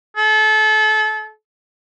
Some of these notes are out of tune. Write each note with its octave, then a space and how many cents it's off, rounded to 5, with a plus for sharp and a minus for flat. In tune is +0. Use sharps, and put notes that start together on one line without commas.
A4 -30